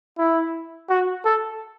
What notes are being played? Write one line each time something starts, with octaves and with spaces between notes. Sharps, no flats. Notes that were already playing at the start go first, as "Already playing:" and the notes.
E4
F#4
A4